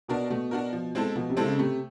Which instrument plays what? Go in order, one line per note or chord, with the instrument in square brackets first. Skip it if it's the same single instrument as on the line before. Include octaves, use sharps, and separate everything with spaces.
[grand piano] B2 [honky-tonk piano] D4 F#4 A#4
[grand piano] B2 [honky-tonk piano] A3
[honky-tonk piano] D4 F#4 A#4
F3
G#3 C4 E4 A4
[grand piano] B2 [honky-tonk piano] F3
[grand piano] C3
[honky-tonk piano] G#3 C4 E4 A4
[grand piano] C#3
[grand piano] C3 [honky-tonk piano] A3